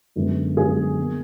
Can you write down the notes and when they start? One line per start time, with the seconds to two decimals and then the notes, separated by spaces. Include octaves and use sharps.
0.16 F#2 D3 G#3 B3
0.57 F#2 D3 G#3 B3 G#4
0.98 B2 A#3